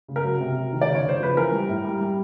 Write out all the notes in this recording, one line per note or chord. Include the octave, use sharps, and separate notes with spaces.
C#3
A#4
F#3
C3
F#3
D#3
D5
C#3
C#5
C#3 C5
F3 B4
E3 A#4
G3
A2
G3
G3